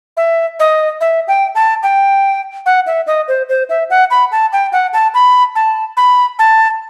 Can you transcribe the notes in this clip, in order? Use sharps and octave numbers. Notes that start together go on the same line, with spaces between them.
E5
D#5
E5
G5
A5
G5
F#5
E5
D#5
C5
C5
E5
F#5
B5
A5
G5
F#5
A5
B5
A5
B5
A5